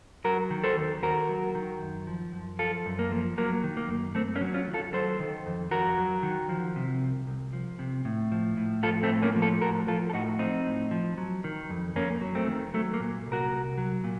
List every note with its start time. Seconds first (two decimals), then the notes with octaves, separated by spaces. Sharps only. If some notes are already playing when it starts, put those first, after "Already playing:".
0.24 F#3 F#4 A#4
0.51 D#3
0.64 A4 C5
0.78 D#2
1.03 D#2 F#4 A#4
1.29 F#3
1.55 D#3
1.81 F#2
2.07 F3
2.33 F#2
2.59 F3 F4 A4
2.86 F#2
2.99 A#3
3.12 F3
3.38 F#3 A#3
3.64 D#3
3.77 A#3
3.89 F#2
4.15 F#2 A3 C4
4.35 A#3 C#4
4.41 F#3
4.54 C#4 F4
4.68 D#3
4.74 F4 A4
4.93 F#3 A4 C5
5.20 D#3
5.46 F2
5.71 F2 F#4 A#4
5.98 F#3
6.23 D#3
6.49 F3
6.76 C3
7.01 C2
7.27 C2
7.53 F3
7.79 C3
8.05 A2
8.32 F3
8.57 A2
8.83 F3 F4 A4
9.03 A3 C4
9.09 A2
9.22 A#3 C#4
9.36 F3
9.42 F4 A4
9.61 A2 F#4 A#4
9.87 F3 F4 A4
10.10 A4
10.13 A2 D#4 F#4
10.39 F3 C4 D#4
10.66 A2
10.91 F3
11.18 F#3
11.44 D#3
11.70 F2
11.96 F2 A#3 C#4
12.21 F#3
12.35 A3 C4
12.47 D#3
12.74 F#3 A3
12.94 A#3
13.00 A#2
13.27 C2
13.32 F#4 A#4
13.52 C2
13.78 F#3
14.04 A#2